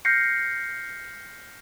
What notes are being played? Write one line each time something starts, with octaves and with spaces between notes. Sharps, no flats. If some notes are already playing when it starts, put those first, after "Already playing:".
F6 G6 A#6 C7 C#7